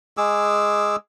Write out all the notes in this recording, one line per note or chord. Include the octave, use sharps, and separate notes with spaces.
G#3 G#4 D6 E6